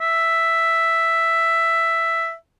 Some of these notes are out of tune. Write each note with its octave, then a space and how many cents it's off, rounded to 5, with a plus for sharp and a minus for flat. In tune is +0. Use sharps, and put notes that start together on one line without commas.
E5 +5